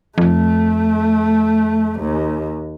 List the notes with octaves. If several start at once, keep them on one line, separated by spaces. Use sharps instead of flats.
F2 A3
D#2